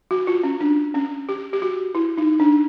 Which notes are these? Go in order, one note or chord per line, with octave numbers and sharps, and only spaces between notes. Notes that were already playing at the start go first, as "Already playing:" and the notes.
F#4
F4
C#4
D4
C#4
G4
G4
F#4
E4
D#4
D4